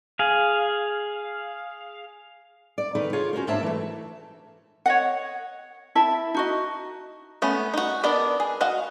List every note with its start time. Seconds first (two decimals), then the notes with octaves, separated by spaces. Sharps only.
0.19 G#4 F5
2.78 D5
2.95 D3 D#3 D#4 B4
3.13 F4 G#4 C#5 F5
3.33 C#4 F#4 A#4 C5
3.47 G#2 A#3 D4 C#5 E5 A5
3.63 E3 A3
4.86 C#5 D#5 F#5
5.95 E4 E5 A5
6.34 D#4 F#4 D#5
7.42 A3 B3 C#4
7.74 D#4 F#4
8.03 B3 D4 A#4 D5 D#5
8.40 G#4
8.61 F#4 D#5 F5 F#5